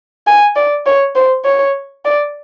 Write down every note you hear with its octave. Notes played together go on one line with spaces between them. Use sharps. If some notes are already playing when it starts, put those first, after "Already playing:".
G#5
D5
C#5
C5
C#5
D5